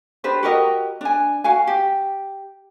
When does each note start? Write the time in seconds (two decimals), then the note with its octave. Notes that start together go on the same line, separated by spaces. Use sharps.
0.24 D4 G4 B4 C5
0.43 F#4 G4 A#4 D#5
1.01 D4 G#5
1.44 F#4 F5 G#5
1.67 G4